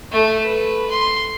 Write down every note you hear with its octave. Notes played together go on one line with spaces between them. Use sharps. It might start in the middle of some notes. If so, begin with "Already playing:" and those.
A3 A4
B4
C6